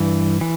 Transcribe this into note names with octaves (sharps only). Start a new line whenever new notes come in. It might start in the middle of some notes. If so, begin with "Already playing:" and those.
Already playing: G2 E3
E3